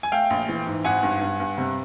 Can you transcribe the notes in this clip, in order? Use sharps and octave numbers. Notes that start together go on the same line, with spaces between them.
G#5
A3 F5 G5
A#1
E3
G#2
G#1 F#5 G#5
G2
G2
G2
C3